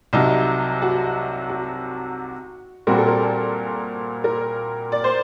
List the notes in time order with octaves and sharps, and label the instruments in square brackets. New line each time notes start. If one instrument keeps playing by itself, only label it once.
[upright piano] C2 C3 F#3 [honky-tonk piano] D#4
[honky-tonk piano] F#4
F#4
[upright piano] A#2 G3 C4 F#4 [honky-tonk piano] A#4
[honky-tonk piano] A4
A#4
A#4
D5
C5